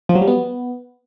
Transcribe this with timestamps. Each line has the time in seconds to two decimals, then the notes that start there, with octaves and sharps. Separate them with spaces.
0.09 F3
0.15 F#3
0.21 G3
0.28 B3